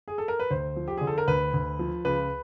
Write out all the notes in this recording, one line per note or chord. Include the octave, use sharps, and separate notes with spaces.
G#4
A4
A#4
B4
D2 C5
F3
G4
D3 G#4
A4
A#4
D2 B4
D2
F3
C#2 B4